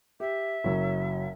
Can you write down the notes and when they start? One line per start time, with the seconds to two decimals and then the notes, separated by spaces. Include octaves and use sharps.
0.20 G4 E5
0.64 F#1 F#3